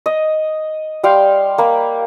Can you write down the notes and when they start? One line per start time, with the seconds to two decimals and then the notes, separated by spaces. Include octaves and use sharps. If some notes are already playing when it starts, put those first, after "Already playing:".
0.06 D#5
1.04 G3 F5 G5 C6
1.58 A#3 B5